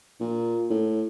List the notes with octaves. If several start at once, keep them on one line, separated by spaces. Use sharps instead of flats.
A#2
A2